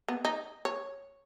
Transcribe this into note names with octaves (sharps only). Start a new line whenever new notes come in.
B3
D#4
C#5